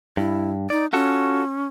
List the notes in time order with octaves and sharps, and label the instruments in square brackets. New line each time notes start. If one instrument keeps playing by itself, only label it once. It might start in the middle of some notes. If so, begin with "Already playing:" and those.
[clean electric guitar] G2 [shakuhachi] E4
[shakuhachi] D#4 [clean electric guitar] D5
[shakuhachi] C#4 [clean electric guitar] F4 F#4 A4